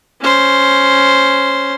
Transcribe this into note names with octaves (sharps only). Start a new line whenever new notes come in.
C#4 C5